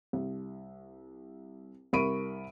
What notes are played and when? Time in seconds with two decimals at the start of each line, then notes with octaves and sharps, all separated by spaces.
0.13 C2
1.93 C2 A#4 B5 C#6 D7 D#7